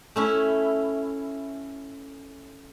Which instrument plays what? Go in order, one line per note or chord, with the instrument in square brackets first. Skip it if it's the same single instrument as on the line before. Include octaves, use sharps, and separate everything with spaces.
[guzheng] A3 C#4 E4